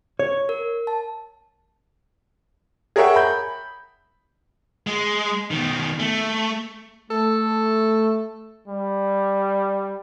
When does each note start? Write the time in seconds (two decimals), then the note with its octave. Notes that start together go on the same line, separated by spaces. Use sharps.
0.19 C#5
0.49 A#4
0.87 A5
2.96 G#4 A#4 C#5 E5 F#5 G5
3.16 B5 G6
4.87 G#3
5.51 B2 D#3
6.00 A3
7.10 A3 A4
8.68 G3